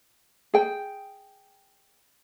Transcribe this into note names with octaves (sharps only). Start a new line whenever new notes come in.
G#4 G5